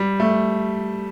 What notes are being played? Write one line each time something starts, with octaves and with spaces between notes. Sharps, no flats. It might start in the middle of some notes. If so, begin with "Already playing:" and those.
Already playing: G3
A3